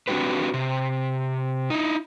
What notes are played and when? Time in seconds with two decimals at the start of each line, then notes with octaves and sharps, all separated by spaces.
0.08 C4 D4 E4 F#4 G4 B4
0.54 C3
1.70 D#4 E4